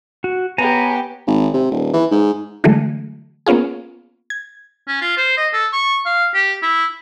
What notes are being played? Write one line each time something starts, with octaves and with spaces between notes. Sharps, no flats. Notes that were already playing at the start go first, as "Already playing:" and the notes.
F#4
B3 G4 C#5 G#5 A#5
G#1
C3
D#1
E3
G#2
D3 E3 F#3 G#3 A3
A#3 B3 C#4 F4 G#4
G#6
C#4
F4
C5
D#5
A4
C#6
F5
G4
E4